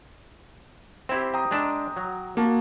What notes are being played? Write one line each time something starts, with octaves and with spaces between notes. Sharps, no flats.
C4 E4 G4 C5
G5 A#5 D#6
G#3 D4 E5
F#3
A#3 F#4 A5